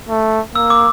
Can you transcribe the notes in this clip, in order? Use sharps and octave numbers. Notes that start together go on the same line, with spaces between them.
A3
A#3 E6
D6